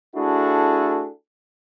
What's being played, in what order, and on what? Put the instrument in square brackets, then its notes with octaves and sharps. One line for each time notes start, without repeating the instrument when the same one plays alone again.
[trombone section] A3 D4 E4 F#4 G#4 A4